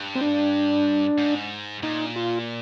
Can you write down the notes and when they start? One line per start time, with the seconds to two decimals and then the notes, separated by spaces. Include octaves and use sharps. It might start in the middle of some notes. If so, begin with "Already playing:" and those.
Already playing: G2
0.15 C4
0.21 D4
1.18 G#2
1.83 A#2 D#4
2.16 F4